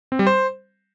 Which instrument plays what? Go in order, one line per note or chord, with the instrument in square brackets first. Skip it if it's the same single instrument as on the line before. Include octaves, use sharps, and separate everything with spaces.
[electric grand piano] C4
G3
C5